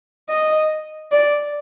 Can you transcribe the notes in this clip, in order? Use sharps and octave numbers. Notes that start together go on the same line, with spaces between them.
D#5
D5